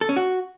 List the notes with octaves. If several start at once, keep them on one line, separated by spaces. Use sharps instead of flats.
A4
C#4
F#4